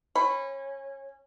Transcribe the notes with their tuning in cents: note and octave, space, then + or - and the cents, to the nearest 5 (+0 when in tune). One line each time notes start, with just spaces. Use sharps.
C#4 -25 B5 +15